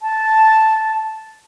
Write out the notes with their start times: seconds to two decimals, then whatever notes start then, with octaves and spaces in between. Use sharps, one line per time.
0.01 A5